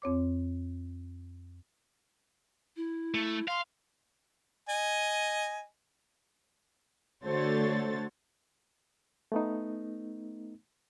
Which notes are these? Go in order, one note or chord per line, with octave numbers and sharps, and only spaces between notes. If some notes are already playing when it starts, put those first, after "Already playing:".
F2 C4 C#5 D6
E4
A3
F5 C6
D#5 G#5
D3 A3 F#4 C5 C#5 A6
A3 B3 D#4